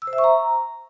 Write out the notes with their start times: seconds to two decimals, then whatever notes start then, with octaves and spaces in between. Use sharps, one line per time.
0.02 E6
0.07 C5
0.13 E5
0.18 C#6
0.24 A#5